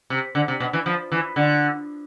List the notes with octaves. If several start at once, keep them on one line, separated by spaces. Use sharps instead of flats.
C3
D3
C3
B2
E3
F3
E3
D3